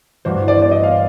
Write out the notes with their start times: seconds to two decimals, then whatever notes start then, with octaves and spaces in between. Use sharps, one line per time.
0.25 G2 E3 A3 D4 F#4 C5
0.48 D5
0.62 D5
0.71 D#5
0.83 F5